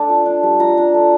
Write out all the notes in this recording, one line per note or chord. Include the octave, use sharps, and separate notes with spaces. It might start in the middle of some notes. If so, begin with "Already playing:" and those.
Already playing: A3 D4 D5
F4
D4
G3
F4 A#5
D4
A3